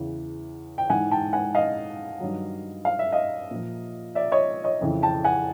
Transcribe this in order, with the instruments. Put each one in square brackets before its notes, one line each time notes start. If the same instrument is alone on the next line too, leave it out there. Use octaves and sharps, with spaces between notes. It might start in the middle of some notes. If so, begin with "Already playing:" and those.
Already playing: [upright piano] E2 C#3 E3
G5
G#2 E3 F#5 G#5
G5 A5
F#5 G#5
D#5 F5
G2 D#3 F#3
F5
E5
D#5 F5
A#2 F3
D5 E5
C#5 D#5
C#5 D#5
F2 C#3 E3
G5 A5
F#5 G#5